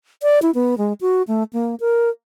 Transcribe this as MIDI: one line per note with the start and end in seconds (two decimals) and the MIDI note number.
0.23 0.39 74
0.42 0.51 64
0.55 0.78 59
0.78 0.93 56
1.01 1.22 66
1.28 1.43 57
1.53 1.75 58
1.80 2.09 70